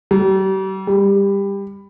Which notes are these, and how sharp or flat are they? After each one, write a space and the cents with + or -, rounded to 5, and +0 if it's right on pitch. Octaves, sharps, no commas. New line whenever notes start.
G3 -40
G3 +20